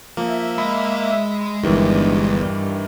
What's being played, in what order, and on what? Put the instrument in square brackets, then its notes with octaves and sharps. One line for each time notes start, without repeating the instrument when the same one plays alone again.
[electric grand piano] F3 [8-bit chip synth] A#3 [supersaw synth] E5
[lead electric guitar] G#3 D#5 [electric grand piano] B5
[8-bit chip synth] G1 E2 [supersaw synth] G2 [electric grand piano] D#3 E3 G3